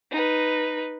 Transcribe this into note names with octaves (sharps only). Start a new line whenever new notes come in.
D#4 B4